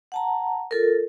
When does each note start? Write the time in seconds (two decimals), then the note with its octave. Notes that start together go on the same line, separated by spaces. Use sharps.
0.12 F#5 A5 A#5
0.71 F4 A4 A#4